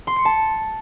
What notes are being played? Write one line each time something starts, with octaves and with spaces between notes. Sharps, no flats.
C6
C#7
A5